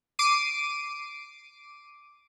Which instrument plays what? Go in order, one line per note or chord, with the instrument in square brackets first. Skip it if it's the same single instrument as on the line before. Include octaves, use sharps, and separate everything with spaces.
[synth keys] D6 C7 D7 D#7